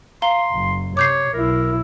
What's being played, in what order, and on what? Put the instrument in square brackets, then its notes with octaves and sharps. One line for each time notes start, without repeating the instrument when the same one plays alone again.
[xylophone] F5 A#5 G7 [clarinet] C6
[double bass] F#1
[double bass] C3 [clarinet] C#5 [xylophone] D6 G6 C7
[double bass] B1 E4 [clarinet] A#4